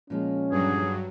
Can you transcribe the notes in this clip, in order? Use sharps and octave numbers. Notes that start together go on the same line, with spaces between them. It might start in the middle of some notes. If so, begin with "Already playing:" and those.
A#2 F3 G#3 C#4
G2 F#3 G#4